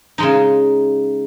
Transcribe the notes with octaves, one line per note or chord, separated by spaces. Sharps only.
C#3 G#3 D#4